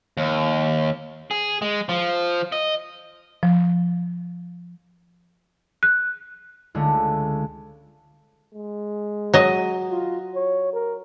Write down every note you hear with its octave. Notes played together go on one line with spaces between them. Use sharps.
D#2
G#4
G#3
F3
D#5
F3
F#6
C#2 D3 A3
G#3
F#3 D#5
F4
C#5
A#4